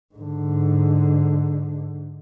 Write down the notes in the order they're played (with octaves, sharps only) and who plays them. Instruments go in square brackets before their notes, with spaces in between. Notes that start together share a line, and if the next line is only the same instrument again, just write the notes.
[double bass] G#2 D3